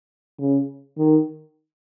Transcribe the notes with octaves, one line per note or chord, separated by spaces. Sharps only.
C#3
D#3